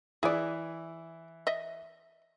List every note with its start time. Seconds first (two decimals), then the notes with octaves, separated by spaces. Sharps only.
0.23 E3 E4 G#4 D5
1.47 D#5 E5